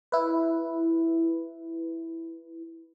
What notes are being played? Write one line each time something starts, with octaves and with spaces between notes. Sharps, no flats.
E4 B4